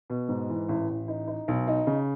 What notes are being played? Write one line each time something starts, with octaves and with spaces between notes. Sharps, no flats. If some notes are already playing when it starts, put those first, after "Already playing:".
B2
G#2
E3
A1
A1
D#4
D#4
B1
D#4
C#3